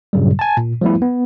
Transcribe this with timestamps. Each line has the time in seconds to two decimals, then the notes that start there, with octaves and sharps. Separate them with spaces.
0.13 G2 A#2 C#3 F#3 G3
0.39 G#5 A5
0.57 A#2
0.81 F3 G3 A3 B3 E4
1.02 B3